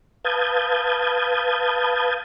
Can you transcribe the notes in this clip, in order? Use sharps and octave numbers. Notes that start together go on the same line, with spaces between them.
B4 F5 A5 D#6 G6 G#6